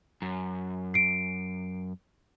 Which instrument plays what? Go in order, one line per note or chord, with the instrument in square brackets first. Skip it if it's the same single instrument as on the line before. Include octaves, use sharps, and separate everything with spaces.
[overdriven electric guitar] F#2
[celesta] C7 D7